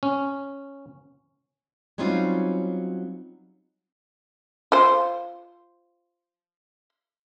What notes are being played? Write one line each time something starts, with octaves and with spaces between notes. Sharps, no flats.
C#4
F#3 G3 C4 C#4 D#4 F4
F4 C5